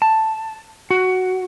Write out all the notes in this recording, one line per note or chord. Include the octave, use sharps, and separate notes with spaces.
A5
F#4